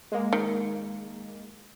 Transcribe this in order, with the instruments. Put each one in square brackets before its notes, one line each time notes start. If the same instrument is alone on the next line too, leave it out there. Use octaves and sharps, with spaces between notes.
[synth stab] G#3 A#3
[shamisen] D#3